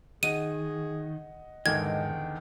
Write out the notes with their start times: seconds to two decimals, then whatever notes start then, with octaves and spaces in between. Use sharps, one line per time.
0.23 D#3 G#4 D#5 F#5 D#7
1.66 E2 G#2 D3 D#3 G#3 D#5 G5 G#6